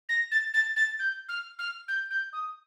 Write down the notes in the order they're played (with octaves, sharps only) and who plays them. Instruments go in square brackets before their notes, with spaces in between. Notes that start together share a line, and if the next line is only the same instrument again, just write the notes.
[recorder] A#6
A6
A6
A6
G6
F6
F6
G6
G6
D#6